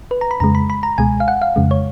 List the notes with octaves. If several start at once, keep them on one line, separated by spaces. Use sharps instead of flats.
B4
A#5
B5
F2 C#3 G#3 A#5
B5
B5
A#5
C#2 B2 G#3 G#5
F5
F#5
F5
F2 C#3 G#3
C#5